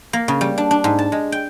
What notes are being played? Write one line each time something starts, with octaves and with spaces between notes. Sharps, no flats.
A#3
C#3
G3
D4
D4
G#2
A5
G#3
G5